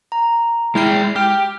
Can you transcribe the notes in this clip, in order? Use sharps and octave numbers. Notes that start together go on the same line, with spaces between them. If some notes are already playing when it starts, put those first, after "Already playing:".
A#5
G#3 E4 G5 G6 C7
G4 F6